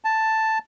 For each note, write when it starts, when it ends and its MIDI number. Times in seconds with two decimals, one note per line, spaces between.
0.05 0.58 81